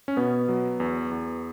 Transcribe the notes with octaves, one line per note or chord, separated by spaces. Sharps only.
C#4
B2 B3
F#3
E2
E2